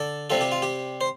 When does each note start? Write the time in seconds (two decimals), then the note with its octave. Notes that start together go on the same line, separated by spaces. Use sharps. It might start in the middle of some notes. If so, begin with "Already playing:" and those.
Already playing: D3 A4 D5
0.30 C3 G3 C4 F4 A4
0.41 G4
0.52 F4
0.62 G4
1.01 C5